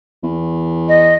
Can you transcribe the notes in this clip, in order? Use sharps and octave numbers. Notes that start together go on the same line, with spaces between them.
E2
D#5